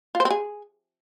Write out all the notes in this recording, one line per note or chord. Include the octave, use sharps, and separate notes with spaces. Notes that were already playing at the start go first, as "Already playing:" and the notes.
F4
C5
C4
G#4